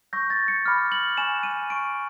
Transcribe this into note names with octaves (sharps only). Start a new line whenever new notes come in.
C#6 E6 G6 A#6
A6
C#7
B5 D6 F6
F#7
G#5 C#6 F#6 E7
D#7
C#6 F6 D7